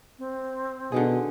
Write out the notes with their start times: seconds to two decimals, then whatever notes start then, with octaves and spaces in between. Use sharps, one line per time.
0.18 C4
0.92 B2 D3 D#3 G#4